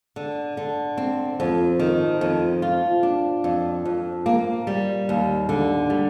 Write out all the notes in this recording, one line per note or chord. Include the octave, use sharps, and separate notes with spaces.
D3
D3
C4
F2
D#3
F2
F4
D4
F2
F2
A#3
G3
D#2
D3
G3